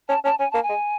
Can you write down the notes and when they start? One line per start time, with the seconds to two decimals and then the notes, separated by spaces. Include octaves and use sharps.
0.09 C#4 A5
0.24 C#4 A5
0.39 C#4 G#5
0.51 A#3 A5
0.63 G#5
0.69 G#3